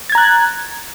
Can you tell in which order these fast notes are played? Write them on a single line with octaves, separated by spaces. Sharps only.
A6 G#6 A#5 F#6